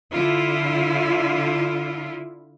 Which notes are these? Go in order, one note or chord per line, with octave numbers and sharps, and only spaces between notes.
D3 E4 F4